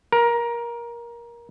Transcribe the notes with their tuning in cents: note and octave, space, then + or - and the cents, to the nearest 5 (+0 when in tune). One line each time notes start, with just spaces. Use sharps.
A#4 +20